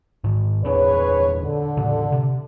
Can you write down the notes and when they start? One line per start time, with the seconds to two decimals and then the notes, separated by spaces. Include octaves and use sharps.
0.24 G#2 D#3
0.65 E2 A#2 D4 G#4 B4 C#5
1.43 D3
1.77 A2 C#3
2.12 C3